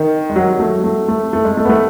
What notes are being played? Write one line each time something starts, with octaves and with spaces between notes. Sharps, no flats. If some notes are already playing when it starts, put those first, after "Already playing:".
Already playing: D#3
G#3
F#3
A3
A3
A3
A3
G#3
A3
B3
A3